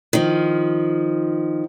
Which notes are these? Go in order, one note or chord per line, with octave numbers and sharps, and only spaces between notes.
D#3 F3